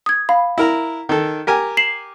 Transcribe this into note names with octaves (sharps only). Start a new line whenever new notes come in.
D#6 G#6
F5 B5
E4 A#4 A#5
D#3 A4
G4 A#4 G#5
C7 E7 F#7